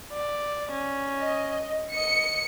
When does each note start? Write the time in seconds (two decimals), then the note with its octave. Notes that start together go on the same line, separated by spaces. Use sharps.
0.13 D5
0.72 C#4
1.19 D#5
1.94 D#5 C#7